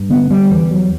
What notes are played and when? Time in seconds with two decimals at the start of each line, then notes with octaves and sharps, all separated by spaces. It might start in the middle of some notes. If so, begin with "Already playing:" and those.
Already playing: G2
0.10 D3 B3
0.30 G3
0.51 E2 E3
0.71 F#3